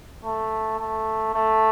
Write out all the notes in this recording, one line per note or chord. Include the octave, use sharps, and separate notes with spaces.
A3
A3
A3